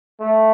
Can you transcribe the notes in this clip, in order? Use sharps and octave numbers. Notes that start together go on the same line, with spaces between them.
A3